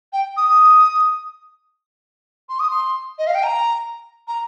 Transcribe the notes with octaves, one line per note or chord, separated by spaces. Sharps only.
G5
D#6
C6
D#6
C6
D#5
F5
G5
A#5
A#5